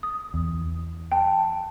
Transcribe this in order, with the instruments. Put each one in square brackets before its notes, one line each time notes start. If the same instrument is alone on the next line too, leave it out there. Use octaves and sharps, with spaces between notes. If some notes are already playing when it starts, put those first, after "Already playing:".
[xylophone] D#6
[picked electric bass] E2
[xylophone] G5 A5